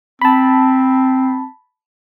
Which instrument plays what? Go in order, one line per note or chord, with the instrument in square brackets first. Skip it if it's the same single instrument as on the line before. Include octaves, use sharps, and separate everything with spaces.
[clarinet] C4 [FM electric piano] A5 B5